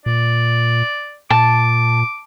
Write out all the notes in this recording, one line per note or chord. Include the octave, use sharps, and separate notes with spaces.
A#2 D5
A#2 A5 D6